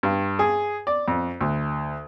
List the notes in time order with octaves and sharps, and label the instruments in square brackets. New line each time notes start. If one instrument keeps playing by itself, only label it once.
[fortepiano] G2
G#4
D5
F2
D2